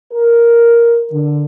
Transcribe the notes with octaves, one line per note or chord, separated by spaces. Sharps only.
A#4
D3